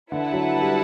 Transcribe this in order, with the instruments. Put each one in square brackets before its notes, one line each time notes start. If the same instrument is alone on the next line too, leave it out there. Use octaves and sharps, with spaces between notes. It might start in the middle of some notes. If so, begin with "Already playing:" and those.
[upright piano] D3 [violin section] E4 B4 F#5 A5
[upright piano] F#3
F#3
G3